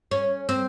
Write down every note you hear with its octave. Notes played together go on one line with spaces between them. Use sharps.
C#4
C4